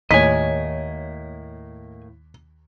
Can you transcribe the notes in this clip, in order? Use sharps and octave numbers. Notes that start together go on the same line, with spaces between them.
D#2 A2 A#3 C#5 D#5 G#5 B6